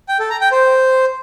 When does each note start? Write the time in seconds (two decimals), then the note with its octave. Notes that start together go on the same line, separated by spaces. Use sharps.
0.09 G5
0.19 A4
0.30 A#5
0.41 G5
0.52 C5